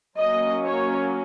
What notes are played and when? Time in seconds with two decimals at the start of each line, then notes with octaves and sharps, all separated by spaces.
0.17 F#3 A#3 C#4 D#5
0.64 C#5